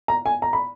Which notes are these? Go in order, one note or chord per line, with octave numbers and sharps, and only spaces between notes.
A#5
G#5
A#5
B5